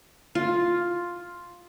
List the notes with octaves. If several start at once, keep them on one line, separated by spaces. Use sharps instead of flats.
F4